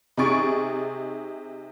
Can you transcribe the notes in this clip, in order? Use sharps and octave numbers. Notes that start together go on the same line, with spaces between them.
C3 D#4 G#4 C#6 A6 D7